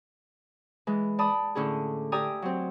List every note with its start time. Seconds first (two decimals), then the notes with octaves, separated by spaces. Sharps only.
0.87 E3 G#3
1.19 D5 A5 B5 D#6
1.55 A2 D3 C#4 E4 G#4
2.12 G4 D5 E5 G#5 A#5 D#6
2.42 F#3 C4